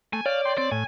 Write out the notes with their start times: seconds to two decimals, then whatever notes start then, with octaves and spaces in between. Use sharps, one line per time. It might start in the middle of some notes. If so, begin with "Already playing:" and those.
0.13 A3 G#5
0.26 C#5 D5 F5
0.45 G5 C6
0.58 C4 D5
0.71 A2 G#5